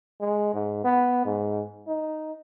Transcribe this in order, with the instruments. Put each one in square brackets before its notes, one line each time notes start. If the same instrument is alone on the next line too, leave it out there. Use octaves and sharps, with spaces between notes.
[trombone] G#3
G#2
B3
G#2
D#4